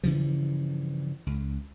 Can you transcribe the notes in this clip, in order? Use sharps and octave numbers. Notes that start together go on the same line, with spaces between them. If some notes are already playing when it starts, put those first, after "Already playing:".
G2 C#3 E3 F3
C#2